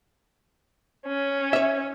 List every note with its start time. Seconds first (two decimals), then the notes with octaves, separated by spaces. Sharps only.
1.06 C#4
1.53 C#5 E5